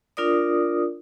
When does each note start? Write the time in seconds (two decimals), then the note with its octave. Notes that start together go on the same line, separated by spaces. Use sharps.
0.17 D4 F4 A#4 D5 D#6